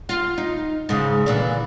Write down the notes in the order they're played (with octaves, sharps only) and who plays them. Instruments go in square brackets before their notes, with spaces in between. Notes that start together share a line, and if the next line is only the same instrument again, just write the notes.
[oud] F4
D#4
G#2 C#3
A#2 D3 E3